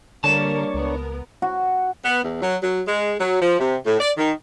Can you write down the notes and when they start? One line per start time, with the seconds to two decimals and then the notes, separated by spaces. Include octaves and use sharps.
0.24 D3 G3 A#3 D4 A#4 C#5 A5
0.74 C#2 B3 A#4
1.42 F#4
2.04 B3
2.23 E2
2.42 F#3
2.62 F#3
2.88 G#3
3.20 F#3
3.42 F3
3.59 C3
3.85 A2
4.00 D5
4.17 D#3